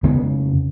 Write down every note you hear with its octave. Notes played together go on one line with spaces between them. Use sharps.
F2 C#3 G#3 B3